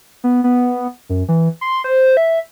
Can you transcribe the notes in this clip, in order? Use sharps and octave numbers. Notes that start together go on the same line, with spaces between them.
B3
B3
F#2
E3
C6
C5
E5